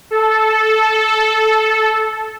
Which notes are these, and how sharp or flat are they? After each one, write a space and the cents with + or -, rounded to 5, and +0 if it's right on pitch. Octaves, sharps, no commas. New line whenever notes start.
A4 -10